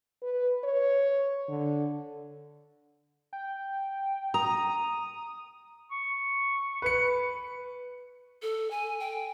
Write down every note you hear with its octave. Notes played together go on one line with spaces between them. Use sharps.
B4
C#5
D3
G5
A#5 D#6
C#6
B4 C#7
A4
G#5
G5